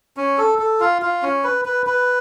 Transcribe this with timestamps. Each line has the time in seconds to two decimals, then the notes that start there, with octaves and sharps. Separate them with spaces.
0.17 C#4
0.38 A4
0.59 A4
0.80 F4
1.02 F4
1.23 C#4
1.44 B4
1.65 B4
1.86 B4